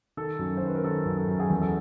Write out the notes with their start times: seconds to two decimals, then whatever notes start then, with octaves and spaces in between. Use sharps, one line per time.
0.17 D#3 A4
0.39 F#2
0.57 C5
0.62 D#3 B4
0.75 A#4
0.84 D#3 A4
1.06 F#2
1.17 A4
1.28 F#2
1.39 G#4
1.50 E2 A4
1.61 A4